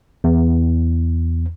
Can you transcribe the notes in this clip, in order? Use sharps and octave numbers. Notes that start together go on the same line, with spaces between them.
E2